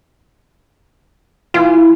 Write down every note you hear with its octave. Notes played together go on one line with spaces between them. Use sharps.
E3 E4 F4 G#5